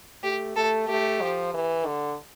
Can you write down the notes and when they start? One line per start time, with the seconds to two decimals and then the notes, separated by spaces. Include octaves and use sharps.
0.23 A3 G4
0.56 A3 A4
0.88 A3 G4
1.21 F3
1.54 E3
1.86 D3